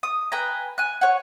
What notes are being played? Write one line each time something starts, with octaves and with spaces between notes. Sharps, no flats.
D#6
B4 G5 G#5 A#5
G#5 F#6
C#5 F#5